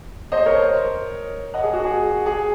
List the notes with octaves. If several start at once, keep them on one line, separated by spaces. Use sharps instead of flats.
C5 D#5
A#4 C#5
D#5 F#5
G#4
F#4
G#4
G#4